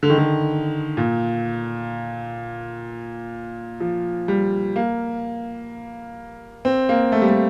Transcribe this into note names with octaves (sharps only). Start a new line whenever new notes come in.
D3
D#3
D3
A#2
F3
G3
A#3
C4
A#3
A3
G3
A3